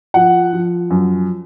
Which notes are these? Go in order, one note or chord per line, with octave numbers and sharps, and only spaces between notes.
F3 F#5
F3
F#2